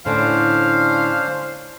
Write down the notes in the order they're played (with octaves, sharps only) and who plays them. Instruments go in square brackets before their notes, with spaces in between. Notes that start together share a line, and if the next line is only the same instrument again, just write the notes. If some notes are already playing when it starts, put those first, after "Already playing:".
[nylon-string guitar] A2 D3 [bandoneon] C#4 D4 C5 [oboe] F5